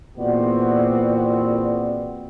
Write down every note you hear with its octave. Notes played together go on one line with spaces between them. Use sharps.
E2 A#2 B3 C4 F#4 D5